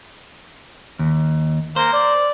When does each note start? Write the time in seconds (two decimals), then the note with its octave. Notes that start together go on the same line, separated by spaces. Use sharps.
0.99 D#2
1.76 A#3 C5
1.93 D5